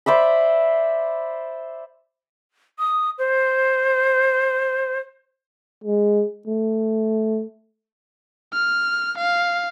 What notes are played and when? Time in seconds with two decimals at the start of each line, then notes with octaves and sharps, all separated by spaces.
0.06 C5 D5 E5 B5
2.79 D#6
3.19 C5
5.84 G#3
6.47 A3
8.53 F6
9.18 F5